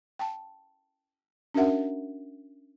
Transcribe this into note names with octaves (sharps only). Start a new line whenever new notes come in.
G5 A5
C#4 D4 F#4 A#4 E5 F#5